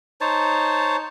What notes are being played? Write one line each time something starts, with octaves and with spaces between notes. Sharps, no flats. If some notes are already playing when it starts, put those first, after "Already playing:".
D#4 C5 C#5 A5